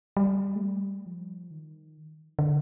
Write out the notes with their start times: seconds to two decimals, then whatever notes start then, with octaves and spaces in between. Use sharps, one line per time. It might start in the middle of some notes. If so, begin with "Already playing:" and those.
0.17 G3
0.56 A3
0.62 G3
1.06 F3
1.51 D#3
2.39 D3